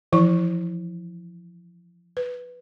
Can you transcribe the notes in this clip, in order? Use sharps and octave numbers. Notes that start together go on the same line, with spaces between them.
E3 F3 E4 C#6
B4